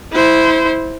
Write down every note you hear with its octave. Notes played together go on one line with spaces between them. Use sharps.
E4 C5